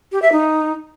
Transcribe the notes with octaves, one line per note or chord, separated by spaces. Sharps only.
G4
E5
D#4